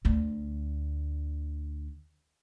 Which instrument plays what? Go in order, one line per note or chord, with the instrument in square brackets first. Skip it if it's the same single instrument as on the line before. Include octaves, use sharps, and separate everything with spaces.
[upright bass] D2 D3